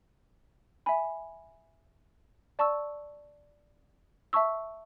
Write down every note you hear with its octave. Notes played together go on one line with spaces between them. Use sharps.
E5 G#5 B5
D5 A5 C#6 E6
E5 A5 C#6 E6